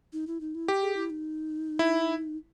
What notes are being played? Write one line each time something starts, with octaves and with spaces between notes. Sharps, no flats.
D#4
E4
D#4
E4
G4
G#4
E4
D#4
E4